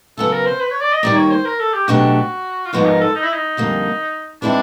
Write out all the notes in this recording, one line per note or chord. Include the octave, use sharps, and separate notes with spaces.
C#3 F#3 B3 A4
A#4
C5
B4
C#5
D5
D#5
D#3 G3 A#3 D5
C#5
C5
A#4
A4
G4
B2 F#3 A3 D4 F#4 G4
F4
G#2 F3 G#3 B3 D#4 F#4
A#4
A4
D#4
E4
D#4
F2 D3 G3 A#3
E3 G#3 C4 D4 E4